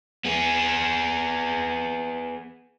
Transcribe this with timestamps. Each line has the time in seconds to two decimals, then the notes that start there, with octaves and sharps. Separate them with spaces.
0.25 B3 G#4